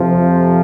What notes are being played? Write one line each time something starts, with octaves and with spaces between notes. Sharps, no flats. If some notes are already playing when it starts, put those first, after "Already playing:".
Already playing: F2 C3 F3